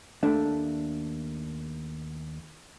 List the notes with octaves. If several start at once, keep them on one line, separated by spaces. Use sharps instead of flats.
D#2 A3 D4